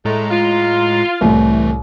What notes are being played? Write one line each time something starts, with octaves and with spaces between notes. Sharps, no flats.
A2 G#3 A3 A#5
F4
C2 A2 E3 A3